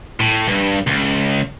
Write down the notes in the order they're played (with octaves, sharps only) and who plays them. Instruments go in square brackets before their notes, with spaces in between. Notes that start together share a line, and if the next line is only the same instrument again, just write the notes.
[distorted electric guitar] A2
G2
C#2